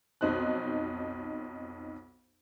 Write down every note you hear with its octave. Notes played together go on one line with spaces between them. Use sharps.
B1 F2 D#4 C5 F#6